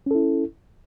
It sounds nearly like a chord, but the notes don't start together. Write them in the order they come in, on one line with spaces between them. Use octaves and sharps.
C#4 A4 E4